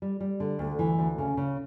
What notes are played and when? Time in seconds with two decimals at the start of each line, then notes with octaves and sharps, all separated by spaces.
0.02 G3
0.20 G3
0.40 D3
0.59 D2
0.79 E3
0.99 D2
1.18 C#3
1.37 C#3